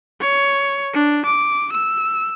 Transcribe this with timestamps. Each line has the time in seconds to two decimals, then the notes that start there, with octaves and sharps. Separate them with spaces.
0.21 C#5
0.94 D4
1.25 D6
1.73 E6